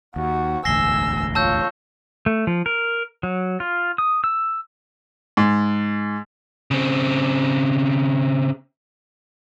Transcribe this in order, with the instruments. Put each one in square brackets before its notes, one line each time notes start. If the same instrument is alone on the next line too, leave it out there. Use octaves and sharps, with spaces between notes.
[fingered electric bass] D#2 [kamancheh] F#4
[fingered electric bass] E1 A1 D2 [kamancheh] G#5 E6 [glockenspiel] A#6 C7 G7
[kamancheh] F4 C#5 [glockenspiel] A5 E6 G6
[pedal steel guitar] A3
F3
A#4
F#3
F4
D#6
E6
[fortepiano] G#2
[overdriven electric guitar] C#3 C4